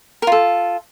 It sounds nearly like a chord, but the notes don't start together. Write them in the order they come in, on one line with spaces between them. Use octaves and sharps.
A#4 F4 A4